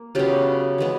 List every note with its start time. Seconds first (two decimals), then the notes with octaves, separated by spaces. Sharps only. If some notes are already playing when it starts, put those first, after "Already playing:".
Already playing: A#3
0.15 C#3 F#3 B3 F4 G4
0.78 E3 G#3 B3